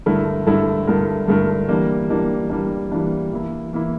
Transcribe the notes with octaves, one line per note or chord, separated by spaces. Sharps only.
G2 D3 A3 E4 A#4
G2 D3 A3 E4 A#4
G2 D3 A3 E4 A#4
G2 D3 A3 E4 A#4
E3 G3 A#3 D4
E3 G3 A#3 D4
E3 G3 A#3 D4
E3 G3 A#3 D4
E3 A#3 E4
E3 A#3 E4